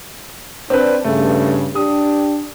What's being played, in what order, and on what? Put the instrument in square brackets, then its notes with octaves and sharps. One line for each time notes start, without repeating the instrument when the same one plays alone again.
[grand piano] C4 B4 [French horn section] D4
[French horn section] G2 C#3 [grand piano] A3
[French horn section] D4 G4 [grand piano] D#6